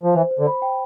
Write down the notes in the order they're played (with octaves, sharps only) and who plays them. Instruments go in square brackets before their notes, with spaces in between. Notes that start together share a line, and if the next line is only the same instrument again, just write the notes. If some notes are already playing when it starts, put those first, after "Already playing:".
[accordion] F3
[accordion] E3 [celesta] C5
[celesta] C5
[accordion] D3
[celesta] B5
G5